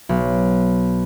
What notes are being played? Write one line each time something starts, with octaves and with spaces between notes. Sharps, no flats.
B1